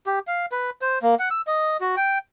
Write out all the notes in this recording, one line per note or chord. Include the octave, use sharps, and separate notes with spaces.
G4
F5
B4
C5
A#3
F#5
E6
D#5
F#4
G5